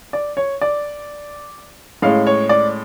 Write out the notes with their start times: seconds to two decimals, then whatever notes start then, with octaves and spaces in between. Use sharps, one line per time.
0.13 D5
0.37 C#5
0.61 D5
2.02 A2 G#3 C#4 F5
2.27 C#5
2.49 D5